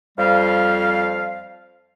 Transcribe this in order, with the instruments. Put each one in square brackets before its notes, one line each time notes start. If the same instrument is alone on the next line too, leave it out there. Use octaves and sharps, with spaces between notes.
[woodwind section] F2 F3 G3 F5